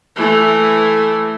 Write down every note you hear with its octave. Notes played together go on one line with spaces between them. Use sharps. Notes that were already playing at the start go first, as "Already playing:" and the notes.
E3 A3